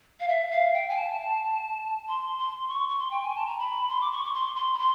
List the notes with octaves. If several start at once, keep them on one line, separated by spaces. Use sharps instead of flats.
F5
E5
F5
G5
G#5
A5
C6
C6
C#6
C#6
C6
G5
G#5
A5
A#5
B5
C6
D6
C#6
C#6
C6
C6
B5
C6